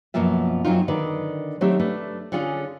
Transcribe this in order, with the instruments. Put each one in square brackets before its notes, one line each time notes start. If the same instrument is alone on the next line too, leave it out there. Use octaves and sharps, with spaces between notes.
[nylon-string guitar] F#2 B2 F3 A#3 F4 E5
F#2 F#3 A#3 C4 D#4 F4
D3 D#3 B4 D5
F#3 A3 C4 D#4 G4 E5
A3 D4 B4
D3 C#4 D4 F4 G#4